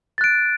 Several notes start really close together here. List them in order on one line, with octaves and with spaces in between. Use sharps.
A6 F#6 D7